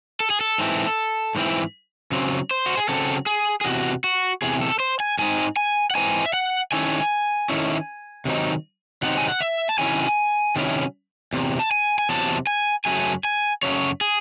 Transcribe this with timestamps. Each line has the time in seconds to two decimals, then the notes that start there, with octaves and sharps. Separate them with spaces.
0.20 A4
0.30 G#4
0.41 A4
0.58 G#2 E3 C4 E4
1.35 G#2 E3 C4 E4
2.12 C#3 F#3 C4
2.51 C5
2.66 F#4
2.77 G#4
2.89 C#3 F#3 C4 A4
3.26 G#4
3.61 G#4
3.65 E2 C3 F#4
4.04 F#4
4.42 E2 C3 G#4
4.61 A4
4.80 C5
5.00 G#5
5.19 G#2 E3 C4 D#4 G#5
5.56 G#5
5.91 F#5
5.95 G#2 E3 C4 D#4 G#5
6.26 E5
6.34 F#5
6.72 D#3 A3 C#4 E4 G#5
7.50 D#3 A3 C#4 E4
8.25 C3 D#3 F#3 C4 D#4
9.02 C3 D#3 F#3 C4 D#4 F#5
9.17 G#5
9.29 F#5
9.40 E5
9.69 A5
9.78 C3 D#3 F#3 C#4 E4 G#5
10.56 C3 D#3 F#3 C#4 E4
11.33 E2 C3
11.59 A5
11.71 G#5
11.98 G#5
12.09 E2 C3 F#3 A5
12.47 G#5
12.85 F#2 C#3 F#3 A3 G#5
13.25 G#5
13.63 F#2 C#3 F#3 A3 C#5
14.01 G#4